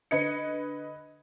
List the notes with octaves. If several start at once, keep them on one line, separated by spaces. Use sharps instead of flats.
D3 B4 D#5 G#6 C#7